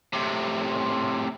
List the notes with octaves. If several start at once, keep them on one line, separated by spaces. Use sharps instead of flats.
A2 C3